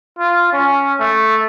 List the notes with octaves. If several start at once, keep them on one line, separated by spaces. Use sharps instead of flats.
F4
C#4
A3